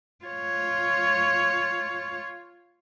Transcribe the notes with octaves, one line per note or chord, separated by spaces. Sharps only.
F4 C#5